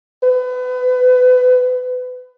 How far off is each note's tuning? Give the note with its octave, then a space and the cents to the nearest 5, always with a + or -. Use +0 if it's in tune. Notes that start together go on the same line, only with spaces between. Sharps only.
B4 +30